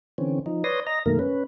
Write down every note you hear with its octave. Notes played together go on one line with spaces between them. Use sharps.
D3 E3 C4 C#4
F3 D#4
B4 C#5 D5 C6 D#6 A#6
D#5 A#5 A#6
F#2 B2 D#3 A3 A#3 A#4
C#4 B4